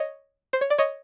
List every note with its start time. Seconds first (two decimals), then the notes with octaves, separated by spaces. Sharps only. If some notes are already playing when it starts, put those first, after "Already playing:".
Already playing: C#5 D#5
0.53 C5
0.61 C#5
0.70 D5
0.78 C#5 D#5